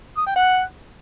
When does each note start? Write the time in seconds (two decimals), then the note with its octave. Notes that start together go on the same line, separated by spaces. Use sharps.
0.17 D#6
0.26 G5
0.36 F#5